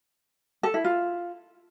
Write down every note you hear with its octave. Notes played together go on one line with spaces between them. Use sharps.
A4
E4
F4